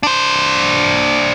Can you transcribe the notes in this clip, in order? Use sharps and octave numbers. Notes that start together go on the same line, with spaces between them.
D4 C5